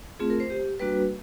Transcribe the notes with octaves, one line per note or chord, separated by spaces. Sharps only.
A3 C4 F4 G#4
A#4
C5
G4
G3 A#3 D4 F#4 B4